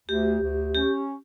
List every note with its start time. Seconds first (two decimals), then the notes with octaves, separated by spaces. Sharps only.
0.09 D2 G4
0.42 D2
0.75 C#4 G4